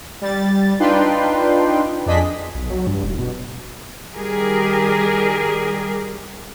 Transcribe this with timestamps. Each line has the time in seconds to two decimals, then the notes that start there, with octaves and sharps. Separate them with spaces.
0.21 G3 A6
0.80 D4 D#4 F4 B4 G5 C6
2.06 F2 D4 G#4 D#5 B6
2.55 B1
2.70 F#3
2.87 G2
3.04 E1
3.18 B2
4.14 D#3 G3 G4 G#4 A#4